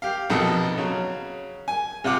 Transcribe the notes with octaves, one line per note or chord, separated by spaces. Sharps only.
G4 F5
A#1 F2 B2 D#4 A4 E6
C#3 F#3
G#5
C3 F4 F#5 D6